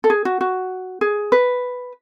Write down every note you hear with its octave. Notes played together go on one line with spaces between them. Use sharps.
A4
G#4
F#4
F#4
G#4
B4